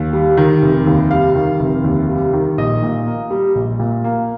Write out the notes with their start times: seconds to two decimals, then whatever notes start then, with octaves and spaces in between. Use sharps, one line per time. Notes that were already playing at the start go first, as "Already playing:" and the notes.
Already playing: D#2
0.13 G3
0.37 D#3
0.62 F1
0.87 D#2
1.11 G3 F5
1.35 D#3
1.59 F1
1.84 D#2
2.09 G3
2.33 D#3
2.58 A#1 D#5
2.83 A#2
3.07 A#3
3.30 G3
3.55 A#1
3.80 A#2
4.04 A#3